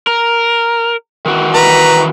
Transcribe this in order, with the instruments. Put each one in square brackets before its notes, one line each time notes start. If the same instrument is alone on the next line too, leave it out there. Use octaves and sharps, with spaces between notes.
[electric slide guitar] A#4
D#3 E3 F#4
[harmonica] B4 A#5